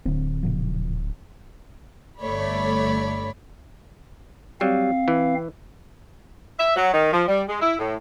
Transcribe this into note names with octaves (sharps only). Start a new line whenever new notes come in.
D1 D3 C4
A#2 C#3 F3
G1 A3 C#5 D5 B5
F#3 G3 C4 F5
E3
E5
F#3
D#3
F3
G3
G#3
E4
A2